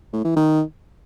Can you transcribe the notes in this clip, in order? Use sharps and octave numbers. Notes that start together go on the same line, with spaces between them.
A2
E3
D#3